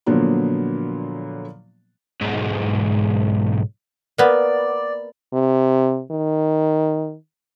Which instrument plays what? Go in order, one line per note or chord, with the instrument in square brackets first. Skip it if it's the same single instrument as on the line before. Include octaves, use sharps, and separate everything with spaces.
[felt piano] A#2 D3 F3 F#3 A#3 B3
[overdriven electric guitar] B1 G#2
[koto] A#3 B3 [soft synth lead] D5
[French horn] C3
D#3